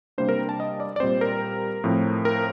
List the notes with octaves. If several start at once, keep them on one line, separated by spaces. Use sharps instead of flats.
C3 G3 A#3 D4 C5
A#4
A5
D#5
D5
D5
A#2 G3 C4 C5
A#4
A2 F3 C4
A#4